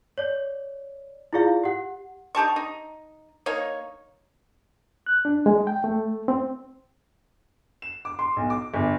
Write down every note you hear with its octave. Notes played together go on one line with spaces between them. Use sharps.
C#5 D5
E4 F4 G#4 D5 F5
G4 F#5
D#4 G4 A5 C#6
D#4
A#3 D#4 C#5
F#6
D4
G#3
G5
A3
C4
E7
D6
C6
B1
D6
G1